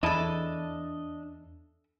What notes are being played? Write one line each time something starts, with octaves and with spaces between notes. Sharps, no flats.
E2 D4 E4 A4 D#5 A5